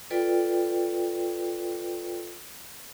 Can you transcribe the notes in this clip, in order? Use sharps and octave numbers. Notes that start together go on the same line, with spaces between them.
F4 A4 B4 D5 G5